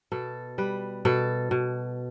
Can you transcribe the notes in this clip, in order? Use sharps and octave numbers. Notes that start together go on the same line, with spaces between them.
B2 A4
G3 B4
B2 A4
B2